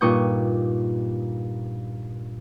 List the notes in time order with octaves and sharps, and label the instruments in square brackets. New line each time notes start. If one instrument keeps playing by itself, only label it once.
[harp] G2 A#2 D#4 C#6 D#6 G6